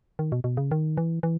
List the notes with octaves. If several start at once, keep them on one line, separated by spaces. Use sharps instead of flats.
D#3
B2
B2
C#3
D#3
E3
E3